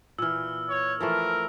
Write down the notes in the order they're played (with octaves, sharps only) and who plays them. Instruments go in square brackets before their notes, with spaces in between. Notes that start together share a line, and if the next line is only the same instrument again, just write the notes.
[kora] A#2 E3 [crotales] E6 F6
[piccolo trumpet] C#5
[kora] E3 F3 A3 [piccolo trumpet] A#4